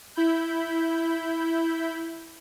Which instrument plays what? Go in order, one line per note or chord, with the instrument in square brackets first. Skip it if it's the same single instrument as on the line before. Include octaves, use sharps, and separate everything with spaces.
[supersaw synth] E4 B5 G6